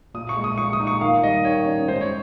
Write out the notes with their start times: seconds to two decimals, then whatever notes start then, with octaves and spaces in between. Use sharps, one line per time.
0.14 A#2 D#6
0.29 C#6
0.36 G#3
0.44 D#6
0.58 A#2 C#6
0.73 D#6
0.80 D#4
0.87 C#6
1.01 D#3 F5
1.23 G3 D#5
1.44 D#3 C#5
1.66 C#4
1.88 G#2 C5
2.01 C#5